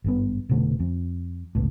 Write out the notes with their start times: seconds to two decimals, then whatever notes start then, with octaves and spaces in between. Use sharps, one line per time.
0.04 G#1 G2 B3
0.49 F1 B2 D3 A3
0.80 F2
1.55 G1 C#2 A2